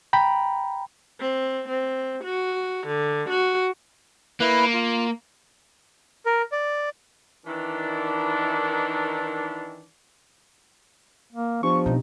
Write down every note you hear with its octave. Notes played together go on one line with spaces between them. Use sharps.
G5 A#5 B5
C4
C4
F#4
D3
F#4
A#3 E4 B4
F4
A#4
D5
D#3 E3 D4
A#3
F3 B3 D4 G4 C#6
B2 C4 D#4